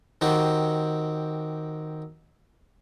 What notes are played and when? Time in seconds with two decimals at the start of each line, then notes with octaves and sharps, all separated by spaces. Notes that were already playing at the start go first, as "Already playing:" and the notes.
0.21 D#3 C4 F#4 G4